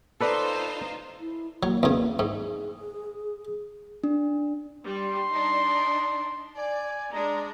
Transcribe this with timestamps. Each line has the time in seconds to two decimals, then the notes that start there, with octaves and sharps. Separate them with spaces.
0.21 D#4 F4 A4 B4 C5 D5
1.20 E4
1.63 F#3 A#3
1.83 E2 C#3
2.19 G#2 G#4
4.04 D4
4.84 G3 C6
5.32 D4 D#4
6.56 D5 G#5
7.12 G#3 D4 A#5